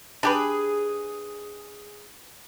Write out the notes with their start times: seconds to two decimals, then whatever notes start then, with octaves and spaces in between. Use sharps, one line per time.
0.23 D4 G4 G#4 B4